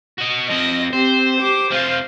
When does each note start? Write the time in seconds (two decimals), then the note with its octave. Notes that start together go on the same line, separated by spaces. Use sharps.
0.18 F#4 D#5
0.49 F3 C4 D#5 A#6
0.93 C4 G4 C5
1.40 G4 D6
1.71 C3 F4 C5 F5